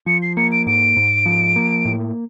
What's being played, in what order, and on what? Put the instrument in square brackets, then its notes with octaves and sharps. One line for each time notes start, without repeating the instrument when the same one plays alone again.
[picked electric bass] F3 [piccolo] C#7
[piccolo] C7
[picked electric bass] A#3 [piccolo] C#7
[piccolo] D7
[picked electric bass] G#2 [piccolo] D7
[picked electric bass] G#2
F3
A#3
A2